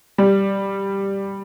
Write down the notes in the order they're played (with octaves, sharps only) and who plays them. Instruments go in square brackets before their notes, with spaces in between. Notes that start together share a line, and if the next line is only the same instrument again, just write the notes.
[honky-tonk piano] G3